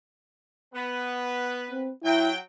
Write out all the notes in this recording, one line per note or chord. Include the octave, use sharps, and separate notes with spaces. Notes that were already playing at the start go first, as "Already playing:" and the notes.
B3 B4
C4
F#3 E4 G5